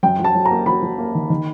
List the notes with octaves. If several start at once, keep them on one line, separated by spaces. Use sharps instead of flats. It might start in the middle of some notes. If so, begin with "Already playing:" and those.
F#2 G5
F#3
A5
F#3
A#5
A#3
F#3 B5
F#3
A#3
D#3
D#3